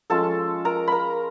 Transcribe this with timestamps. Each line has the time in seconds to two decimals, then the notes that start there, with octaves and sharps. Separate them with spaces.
0.10 F3 G#3 C#4 F4 A4 A5
0.65 A#4 A#5
0.87 A#4 A#5 B5